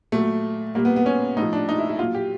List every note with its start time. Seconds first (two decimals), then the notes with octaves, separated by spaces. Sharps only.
0.12 A#2 F#3 A3
0.75 A#2 G3 A#3
0.85 B3
0.96 B3
1.06 C#4
1.37 A2 D#4
1.42 F3
1.53 D4
1.69 D#4
1.78 E4
1.89 E4
1.99 A#2 F#3 F4
2.15 G4